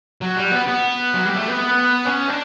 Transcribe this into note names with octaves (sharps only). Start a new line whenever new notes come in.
F#3
G3
B3
B3
F#3
G3
A3
B3
C#4
D4